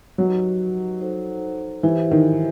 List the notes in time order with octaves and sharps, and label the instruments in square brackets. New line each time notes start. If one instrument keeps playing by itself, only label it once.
[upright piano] F#3 [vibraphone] D#4 G4 B4 D#5 F#5
[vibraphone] D#4 A4 C5 F#5
[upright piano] E3 [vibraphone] E4 G4 C5 E5
[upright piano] D#3